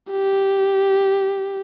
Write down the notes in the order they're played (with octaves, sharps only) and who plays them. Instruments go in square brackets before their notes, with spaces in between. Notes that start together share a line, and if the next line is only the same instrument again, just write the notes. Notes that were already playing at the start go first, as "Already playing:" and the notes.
[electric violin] G4